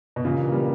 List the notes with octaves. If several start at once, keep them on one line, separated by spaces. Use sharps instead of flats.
B2
G2 A#2 C#3 E3 A#3
G3